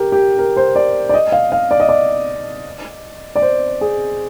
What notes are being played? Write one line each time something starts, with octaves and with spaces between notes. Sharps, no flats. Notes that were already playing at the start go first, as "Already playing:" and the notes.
Already playing: G4 A#4
G4
A#4
C5
D5
D5
D#5
F5
F5
D5
D#5
D5
D5
C5
G#4